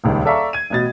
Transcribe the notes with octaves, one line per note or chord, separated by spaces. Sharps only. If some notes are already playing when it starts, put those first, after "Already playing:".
D#1 C#2 D#3
A4 D5 E5 F5 A#5 C#6
G#6 D#7
A1 B2 A6